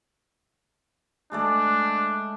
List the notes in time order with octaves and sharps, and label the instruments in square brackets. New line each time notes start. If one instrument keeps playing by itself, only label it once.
[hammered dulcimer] G#3 A3 D5 [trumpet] D4